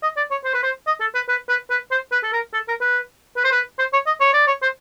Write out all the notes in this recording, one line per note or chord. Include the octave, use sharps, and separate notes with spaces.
D#5
D5
C#5
C5
B4
C5
D#5
A4
B4
B4
B4
B4
C5
B4
A4
A#4
A4
A#4
B4
B4
C5
B4
C5
C#5
D#5
C#5
D5
C#5
C5